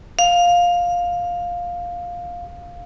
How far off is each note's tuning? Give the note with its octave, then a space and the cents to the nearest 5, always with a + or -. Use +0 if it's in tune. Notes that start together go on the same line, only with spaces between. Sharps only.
F5 +10